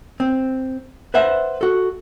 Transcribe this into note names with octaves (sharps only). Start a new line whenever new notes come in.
C4
B4 C5 E5 F#5
F#4 A4